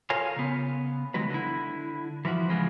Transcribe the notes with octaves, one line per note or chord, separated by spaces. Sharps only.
F4 A4 A#4 C#5 F5 G#5
C#3 B3
D#3 F#3 G#3 F#4 B4
D3 E4
E3 F3 E4 F#4
C#3 E3 F3 G#3 C4